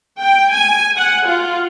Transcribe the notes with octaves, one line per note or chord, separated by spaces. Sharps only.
G5
G#5
F#5
F4